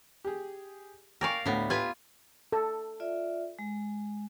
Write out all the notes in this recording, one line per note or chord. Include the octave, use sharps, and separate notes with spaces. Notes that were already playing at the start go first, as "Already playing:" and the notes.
G4 G#4
A#4 D5 F5 G5 G#5 C#6
D2 A2 B3
F4 G4 B4 G#5
A4
F4 D5 E5
G#3